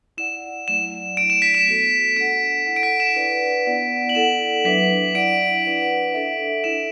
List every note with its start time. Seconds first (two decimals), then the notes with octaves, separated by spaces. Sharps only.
0.18 E4 D5 F#5 E7
0.68 F#3 A3 E4 D5 F#5 E7
1.17 F#3 A3 D4 D7
1.30 E7
1.42 B6
1.55 E7
1.67 B3 F#4 A4
2.16 D4 A4 F#5 D7
2.66 E4 A4 F#5
2.76 D7
2.83 B6
3.00 E7
3.16 D4 B4 D5 F#5
3.66 B3 E4 D5 F#5
4.09 F#7
4.15 E4 A4 F#5 E7
4.65 F#3 D4 B4 E5 B6
5.15 E4 D5 F#5 D7
5.64 D4 B4 F#5
6.14 D4 A4 E5
6.64 E4 A4 E5 E7